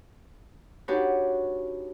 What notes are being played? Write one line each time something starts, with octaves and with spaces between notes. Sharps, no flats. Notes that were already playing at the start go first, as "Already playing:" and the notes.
D4 D#4 F#4 G4 B4 C#5